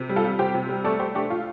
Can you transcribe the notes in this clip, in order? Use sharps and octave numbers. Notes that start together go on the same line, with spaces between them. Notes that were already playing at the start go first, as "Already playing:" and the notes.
Already playing: C3
G3
F4 A4
G3
C3 G4 C5
C3
G3
A3 A4 D5
A3 G4 C5
A3 D4 G4
A3 F4